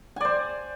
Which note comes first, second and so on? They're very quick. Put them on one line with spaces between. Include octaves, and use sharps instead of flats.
G#5 D5 C5